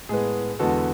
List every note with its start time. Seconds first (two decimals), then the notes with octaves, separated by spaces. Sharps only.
0.09 A2 G#3 B3 G#4
0.59 E2 D3 G#3 B3 F#4 A4